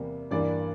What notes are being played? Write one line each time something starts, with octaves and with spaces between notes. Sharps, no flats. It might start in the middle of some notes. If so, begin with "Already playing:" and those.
Already playing: E2 C3 G3 A#3
G2 E3 G3 A#3 D5